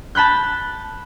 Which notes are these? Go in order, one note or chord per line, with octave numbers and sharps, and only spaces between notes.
A5 B5 F#6 G6